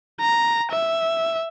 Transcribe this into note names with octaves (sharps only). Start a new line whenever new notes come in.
A#5
E5